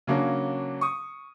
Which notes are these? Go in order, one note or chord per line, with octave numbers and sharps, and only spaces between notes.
C#3 F#3 A#3 C#4 D4
C#6 D#6